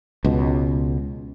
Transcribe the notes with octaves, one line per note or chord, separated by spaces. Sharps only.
C#2 B2